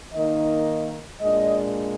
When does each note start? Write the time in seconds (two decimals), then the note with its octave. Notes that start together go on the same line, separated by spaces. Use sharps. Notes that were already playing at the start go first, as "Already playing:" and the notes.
0.14 D#3 A#3 D#4 D#5
1.21 A#2 G#3 D4 D#5